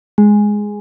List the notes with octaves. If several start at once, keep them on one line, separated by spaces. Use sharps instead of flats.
G#3